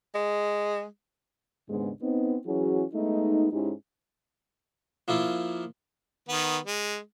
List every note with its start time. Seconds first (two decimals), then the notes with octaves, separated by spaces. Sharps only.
0.15 G#3
1.69 D#2 G#2 C#3 G#3 B3 D4
2.02 B3 C4 D#4
2.46 E3 F#3 C#4 E4 F#4 G#4
2.94 G#3 A3 B3 D#4
3.52 G#2 G#3 C#4 D#4 E4 G4
5.08 F3 A#3 E4 F4
6.29 D#3 B3
6.65 G#3